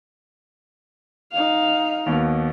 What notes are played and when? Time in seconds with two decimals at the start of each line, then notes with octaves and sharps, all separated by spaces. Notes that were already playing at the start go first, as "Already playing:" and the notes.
1.32 D#4 F5
2.06 D#2 B2